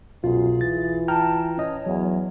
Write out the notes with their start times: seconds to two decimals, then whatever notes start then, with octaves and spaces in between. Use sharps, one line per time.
0.24 C2 F#2 B2 F4 G#4
0.61 E3 A6
1.08 G5 A5 A#5 F6
1.57 C#4 C#5 D#5
1.86 E2 F#3